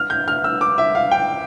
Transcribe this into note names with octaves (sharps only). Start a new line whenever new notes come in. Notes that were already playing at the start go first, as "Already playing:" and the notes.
Already playing: F6
G6
F6
E6
D6
E5
F5
G5